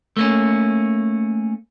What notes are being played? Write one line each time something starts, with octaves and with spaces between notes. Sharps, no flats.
A3 A#3 C#4